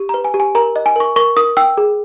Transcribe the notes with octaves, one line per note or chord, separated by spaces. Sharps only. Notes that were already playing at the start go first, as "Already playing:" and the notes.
Already playing: G4
A#5
B4
G#5
G4
G#5
A#4 A#5
D#5
G#5
A#4 C#6
A#4 C#6
A#4 D#6
G5 E6
G#4